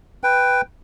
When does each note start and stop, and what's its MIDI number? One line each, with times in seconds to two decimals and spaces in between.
0.24 0.62 71
0.24 0.62 79